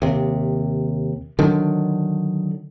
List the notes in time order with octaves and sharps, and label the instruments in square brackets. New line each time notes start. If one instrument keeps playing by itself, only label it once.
[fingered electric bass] D#2 C3
D3 D#3 F#3 D4